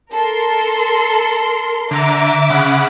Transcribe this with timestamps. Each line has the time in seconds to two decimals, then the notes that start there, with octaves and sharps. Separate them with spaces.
0.12 A4 A#4 C6
1.91 D3 E5 A#5 D6
2.50 C#3 F#5 B5